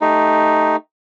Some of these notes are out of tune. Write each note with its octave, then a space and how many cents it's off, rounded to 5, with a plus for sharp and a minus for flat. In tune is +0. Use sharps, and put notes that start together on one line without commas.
A3 +0 D#4 +0 G4 +0